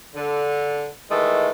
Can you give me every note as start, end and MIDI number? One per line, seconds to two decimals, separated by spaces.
0.15 0.87 50
1.10 1.50 51
1.10 1.50 52
1.10 1.50 56
1.10 1.50 57